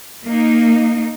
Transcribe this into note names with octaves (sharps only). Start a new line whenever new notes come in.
A#3 D#4